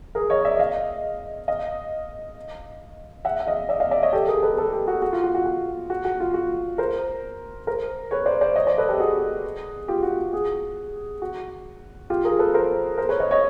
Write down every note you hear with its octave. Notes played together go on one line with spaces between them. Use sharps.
G#4 A#4
C#5 D#5
D5 E5
D#5 F5
D#5 F5
E5 F#5
E5
D#5 F5
D5 E5
D#5 F5
D5 E5
C#5 D#5
G4 A4
G#4 A#4
A4 B4
A4 B4
G4 A4
F#4
F#4
F4
F#4
F#4
F#4
F#4
F#4
F4
F#4
A#4 C5
A#4 C5
B4 C#5
C5 D5
C5 D5
C#5 D#5
C5 D5
A4 B4
G4 A4
F#4 G#4
F4 G4
F#4
F#4 G#4
F#4
F4 G4
G#4 A#4
A4 B4
A#4 C5
A#4 C5
B4 C#5
C#5 D#5
C#5 D#5